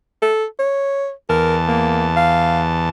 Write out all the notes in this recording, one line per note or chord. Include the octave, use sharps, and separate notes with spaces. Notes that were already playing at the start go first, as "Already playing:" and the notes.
A4
C#5
E2 A#4 A5
A#3
F5